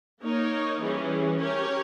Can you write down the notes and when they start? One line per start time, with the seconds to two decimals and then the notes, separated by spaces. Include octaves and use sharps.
0.21 A#3 D#4 A#4 C#5
0.80 E3 G3 C#4 G#4
1.38 C#4 G4 A#4 C#5